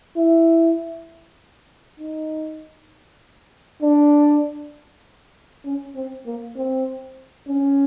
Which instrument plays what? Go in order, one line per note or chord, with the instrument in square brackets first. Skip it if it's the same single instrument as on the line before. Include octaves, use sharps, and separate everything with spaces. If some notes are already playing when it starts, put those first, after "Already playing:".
[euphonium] E4
D#4
D4
C#4
C4
A#3
C4
C#4